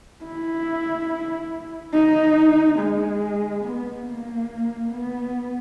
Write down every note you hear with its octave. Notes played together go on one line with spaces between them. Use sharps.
E4
D#4
G#3
B3
A#3
B3